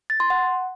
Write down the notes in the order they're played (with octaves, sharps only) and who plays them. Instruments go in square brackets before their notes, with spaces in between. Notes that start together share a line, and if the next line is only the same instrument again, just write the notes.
[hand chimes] A6
C6
F#5